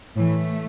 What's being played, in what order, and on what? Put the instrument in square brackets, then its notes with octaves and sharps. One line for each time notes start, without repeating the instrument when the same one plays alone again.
[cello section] A2 E3 A3